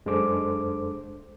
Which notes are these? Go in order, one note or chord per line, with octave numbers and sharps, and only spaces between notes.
F#2 G#3 D4 A4 C5 D6